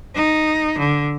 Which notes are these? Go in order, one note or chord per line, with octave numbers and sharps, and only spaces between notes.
D#4
D3